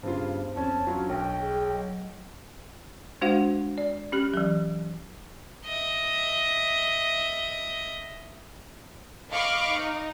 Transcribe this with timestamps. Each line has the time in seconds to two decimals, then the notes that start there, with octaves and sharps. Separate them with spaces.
0.03 G2 C#3 B3 F4 C5
0.56 F2 C#4 A5
0.87 F#3 C#4 D4 F4 C#6
1.09 B1 G5
1.39 G#4 C#5
1.72 F#3 D#5
3.21 G#3 D4 F#4 C5 F5 F#5
3.78 D5
4.12 C#4 G4 F#6
4.34 E3 F#3
5.66 D#5 E5
9.30 D#5 F5 B5 C#6 D6
9.71 D#4